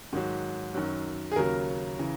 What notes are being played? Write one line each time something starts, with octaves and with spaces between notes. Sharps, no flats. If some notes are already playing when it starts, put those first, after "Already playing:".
G#2 D#3 F#3
F#2 D#3 F#3
G#4
D#2 C#3 F#3 A#4
C#3 E3